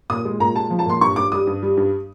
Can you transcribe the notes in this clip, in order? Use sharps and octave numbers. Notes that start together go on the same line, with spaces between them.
A#2 D#6
G#3
A#2 A#5
G#3 A5
F3
A5
A#2 C6
G2 C#6
G2 D6
G3 D#6
G2
G3
G2